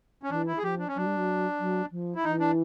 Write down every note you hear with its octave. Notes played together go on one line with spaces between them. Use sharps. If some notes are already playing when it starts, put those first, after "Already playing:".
C#4
E3 D4
E4
G#4
F3 G4
D4
C#4
F#3 D4
G3
F#3
F#3
F3
E4
E3 D#4
D4